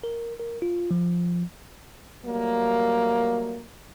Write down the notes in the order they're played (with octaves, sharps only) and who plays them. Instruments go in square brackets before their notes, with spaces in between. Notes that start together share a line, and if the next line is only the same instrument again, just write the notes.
[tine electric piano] A#4
A#4
F4
F3
[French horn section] F#3 G3 A3 A#3